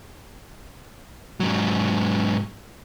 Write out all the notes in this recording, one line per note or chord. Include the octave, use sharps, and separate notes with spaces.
G#2 F#3